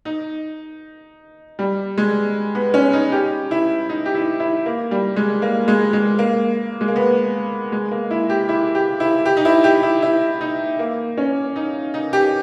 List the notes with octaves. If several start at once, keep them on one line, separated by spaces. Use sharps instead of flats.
D#4
G3
G#3
B3
C#4
D#4
G4
E4
D#4
G4
E4
E4
A#3
G3
G#3
A#3
G#3
G#3
A#3
G#3
A#3
B3
G#3
A#3
E4
G4
E4
G4
E4
G4
D#4
E4
G4
E4
E4
D#4
A#3
C#4
D#4
D#4
G4